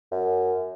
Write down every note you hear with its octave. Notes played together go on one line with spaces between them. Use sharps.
F#2